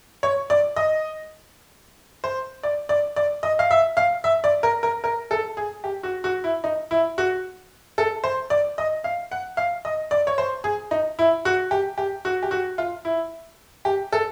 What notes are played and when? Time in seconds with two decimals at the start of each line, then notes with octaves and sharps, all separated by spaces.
0.23 C#5
0.50 D5
0.76 D#5
2.24 C5
2.63 D5
2.89 D5
3.16 D5
3.43 D#5
3.59 F5
3.71 E5
3.97 F5
4.24 E5
4.44 D5
4.63 A#4
4.83 A#4
5.04 A#4
5.31 A4
5.57 G#4
5.84 G4
6.03 F#4
6.24 F#4
6.44 E4
6.64 D#4
6.91 E4
7.18 F#4
7.98 A4
8.24 C5
8.50 D5
8.78 D#5
9.04 F5
9.32 F#5
9.57 F5
9.85 D#5
10.11 D5
10.27 C#5
10.38 C5
10.64 G#4
10.91 D#4
11.19 E4
11.45 F#4
11.71 G4
11.98 G4
12.25 F#4
12.43 G4
12.51 F#4
12.78 F4
13.05 E4
13.85 G4
14.13 A4